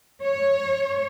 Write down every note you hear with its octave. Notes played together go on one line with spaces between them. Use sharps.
C#5